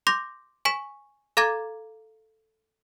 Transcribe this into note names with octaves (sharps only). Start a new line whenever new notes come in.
C6 D6 G6 A#6
G#5 C#6 B6 E7
A4 F5 A#5 D6 G#6 A6